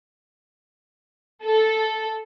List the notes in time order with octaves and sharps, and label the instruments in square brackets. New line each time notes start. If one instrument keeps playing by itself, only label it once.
[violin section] A4